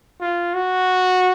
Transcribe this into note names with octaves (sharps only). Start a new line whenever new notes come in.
F4
F#4